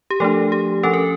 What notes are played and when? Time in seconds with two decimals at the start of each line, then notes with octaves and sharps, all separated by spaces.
0.10 G4
0.20 F3 A3 D4 A4
0.52 G4
0.83 F3 C#4 A4
0.93 A#4